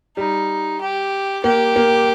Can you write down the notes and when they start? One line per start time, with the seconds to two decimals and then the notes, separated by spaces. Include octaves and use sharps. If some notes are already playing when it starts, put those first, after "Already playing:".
0.17 G3 D#4
0.81 G4
1.44 A#3 G4
1.76 A#3